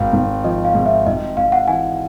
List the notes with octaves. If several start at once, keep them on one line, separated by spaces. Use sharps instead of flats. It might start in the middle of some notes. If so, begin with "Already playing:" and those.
Already playing: G#1 F5
G#1
F3 D#5
F5
G#2
E5
G#1 D#5
G#1 F5
F#5
E3 G#5